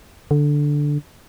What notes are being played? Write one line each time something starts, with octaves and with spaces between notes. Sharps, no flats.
D3